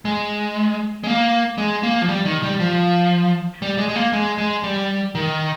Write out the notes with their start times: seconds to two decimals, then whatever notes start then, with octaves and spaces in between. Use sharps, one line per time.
0.05 G#3
1.04 G#3
1.07 A#3
1.58 G#3
1.83 A#3
2.02 F3
2.08 G3
2.25 D#3
2.43 G3
2.60 F3
3.62 G3
3.78 G#3
3.88 G#3
3.96 A#3
4.13 G#3
4.38 G#3
4.63 G3
5.15 D#3